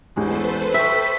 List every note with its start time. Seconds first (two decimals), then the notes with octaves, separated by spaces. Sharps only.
0.16 A1 E2 G#3 A4 B4 C5
0.74 E5 G5 C#6 B6